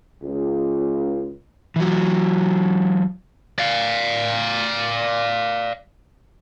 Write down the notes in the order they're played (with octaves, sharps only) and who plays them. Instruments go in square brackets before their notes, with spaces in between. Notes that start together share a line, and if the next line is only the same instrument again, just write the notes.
[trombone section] C#2
[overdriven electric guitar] E3 F#3
[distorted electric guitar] D5 F5